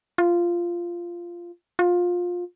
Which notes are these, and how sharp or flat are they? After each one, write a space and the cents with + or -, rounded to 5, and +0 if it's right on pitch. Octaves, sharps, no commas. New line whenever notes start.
F4 -10
F4 +20